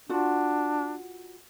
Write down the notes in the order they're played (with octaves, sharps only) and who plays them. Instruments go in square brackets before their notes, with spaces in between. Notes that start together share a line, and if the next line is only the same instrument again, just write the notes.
[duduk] D4 [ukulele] F4 F#4